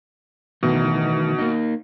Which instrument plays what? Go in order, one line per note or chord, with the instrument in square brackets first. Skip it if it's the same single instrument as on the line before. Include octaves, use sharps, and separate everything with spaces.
[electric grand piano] B2 [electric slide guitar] D#3 E3 A3
[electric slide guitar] A#3 D#4